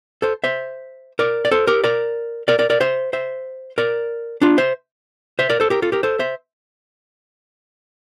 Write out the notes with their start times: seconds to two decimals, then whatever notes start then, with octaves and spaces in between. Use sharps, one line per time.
0.22 A4 C5
0.44 C5 E5
1.19 A#4 D5
1.45 D5
1.51 A4 C5
1.67 G4 A#4
1.84 A#4 D5
2.48 A#4 D5
2.59 A#4 D5
2.70 A#4 D5
2.81 C5 E5
3.13 C5 E5
3.78 A#4 D5
4.42 D4 F4
4.58 C5 E5
5.39 C5 E5
5.50 A#4 D5
5.60 A4 C5
5.70 G4 A#4
5.82 F4 A4
5.92 G4 A#4
6.03 A4 C5
6.19 C5 E5